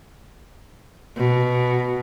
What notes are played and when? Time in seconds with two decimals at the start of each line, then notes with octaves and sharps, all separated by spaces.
1.17 B2